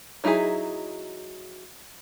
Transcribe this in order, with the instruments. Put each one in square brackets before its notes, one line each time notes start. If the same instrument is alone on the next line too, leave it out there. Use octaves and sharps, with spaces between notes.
[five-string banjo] F#3 D#4 E4 F#4 G#4